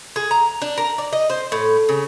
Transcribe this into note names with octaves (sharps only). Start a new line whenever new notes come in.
G#4
A#5
D4
A#4
D5
D#5
C5
A2
C#3